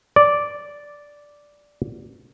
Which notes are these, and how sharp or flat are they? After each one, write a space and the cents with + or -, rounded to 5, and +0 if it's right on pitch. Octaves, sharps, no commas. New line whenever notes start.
D5 -5